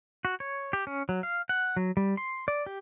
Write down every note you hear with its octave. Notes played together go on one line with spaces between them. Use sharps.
F#4
C#5
G4
C#4
F#3
F5
F#5
F#3
G3
C6
D5
G4